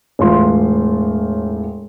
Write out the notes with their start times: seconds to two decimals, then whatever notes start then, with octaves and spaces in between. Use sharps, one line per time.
0.19 E1 A2 F4 C6